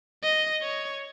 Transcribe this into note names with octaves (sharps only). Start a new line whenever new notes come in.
D#5
C#5